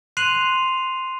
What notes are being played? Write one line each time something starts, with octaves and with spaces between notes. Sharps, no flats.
C6 F#6 C7 D#7 F7 F#7